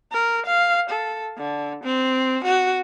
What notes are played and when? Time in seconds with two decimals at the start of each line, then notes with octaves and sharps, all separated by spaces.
0.12 A#4
0.46 F5
0.89 A4
1.37 D3
1.84 C4
2.44 F#4